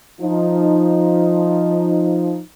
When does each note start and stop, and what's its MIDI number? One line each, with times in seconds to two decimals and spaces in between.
0.21 2.40 53
0.21 2.40 63